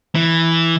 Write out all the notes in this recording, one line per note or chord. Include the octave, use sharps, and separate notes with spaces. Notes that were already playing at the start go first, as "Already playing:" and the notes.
E3